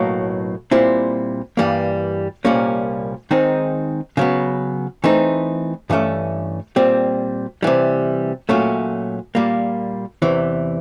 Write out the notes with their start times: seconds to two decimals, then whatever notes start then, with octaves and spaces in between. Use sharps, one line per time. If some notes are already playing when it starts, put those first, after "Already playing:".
Already playing: B1 A2 F#3 A#3
0.71 A#2 G3 C4 E4
1.57 G2 E3 G3 A#3
2.45 C2 A#2 G3 A#3 C#4
3.31 D#3 G#3 C4 D#4 G#4
4.17 C#3 F#3 B3
5.04 E3 A3 C4 D#4
5.90 G2 E3 A3 C#4
6.76 A#2 G3 C4
7.63 C3 E3 G3
8.49 A#2 F#3 A3 C#4
9.35 A#2 G3 A#3
10.22 E2 C3 E3